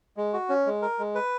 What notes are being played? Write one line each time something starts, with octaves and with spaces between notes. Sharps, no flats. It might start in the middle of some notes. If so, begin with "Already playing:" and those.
G#3
F#4
C#4
G#3
A#4
G#3
B4